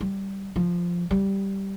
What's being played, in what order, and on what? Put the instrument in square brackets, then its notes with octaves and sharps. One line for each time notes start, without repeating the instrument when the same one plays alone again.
[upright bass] G3
F3
G3